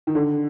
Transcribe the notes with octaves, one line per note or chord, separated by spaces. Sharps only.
D#3
D3